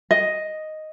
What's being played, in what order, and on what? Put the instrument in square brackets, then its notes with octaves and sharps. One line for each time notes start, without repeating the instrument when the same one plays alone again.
[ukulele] D#5